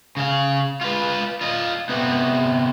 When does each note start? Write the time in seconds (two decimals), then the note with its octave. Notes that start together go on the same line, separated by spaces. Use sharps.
0.17 C#3 F5
0.81 F4 B4
1.41 F4 D#5
1.89 C3 B3